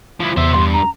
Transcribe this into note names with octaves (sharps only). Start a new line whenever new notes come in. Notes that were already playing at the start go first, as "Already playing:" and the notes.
F3 E4
E2 C5 E5
C#2 G2 C6
A#5